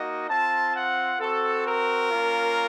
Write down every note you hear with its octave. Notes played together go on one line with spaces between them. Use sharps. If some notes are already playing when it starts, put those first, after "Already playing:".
Already playing: A#3 D#4 F#4 D#5
C4 F4 A5
F#5
C4 F#4 A4
A#4
A#3 C#4 F4